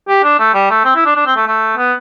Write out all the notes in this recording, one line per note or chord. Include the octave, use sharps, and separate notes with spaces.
G4
D4
A3
G3
A3
C4
E4
D4
D4
C4
A3
A3
B3